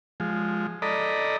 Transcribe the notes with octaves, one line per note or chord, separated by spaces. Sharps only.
F3 G#3
A4 D5 D#5 A#5 B5